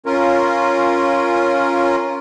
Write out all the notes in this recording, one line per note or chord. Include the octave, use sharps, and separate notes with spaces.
C#4 F4 A#4